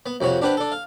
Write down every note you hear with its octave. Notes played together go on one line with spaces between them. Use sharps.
B3
F2 C3 F#4 C#5
D4 G4 B4 C5 F#5
D4 A4
F5